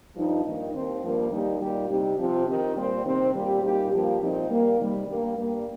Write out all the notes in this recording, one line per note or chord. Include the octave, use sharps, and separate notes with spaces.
G2 F3 D#4
G2 D#3 A#3 D#4
D#2 D#3 C4
G2 F3 A#3
D#2 D#3 G3 D#4 G4
A#2 G3 D#4 G4
C3 G3 D#4 G4
C3 F3 C4 F4
D#3 C4 D#4 G4
A#2 G3 C4
C3 D#3 C4
A#2 G3 C4 G4
A#2 G3 D#4 G4
G2 F3 A#3 G4
A#2 F3 C4 D#4 G4
A#2 G3 A#3
C3 D#3 G3
G2 G3 A#3
G2 G3 A#3